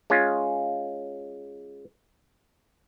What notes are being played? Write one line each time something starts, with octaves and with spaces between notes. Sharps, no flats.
G#3 C#4 F4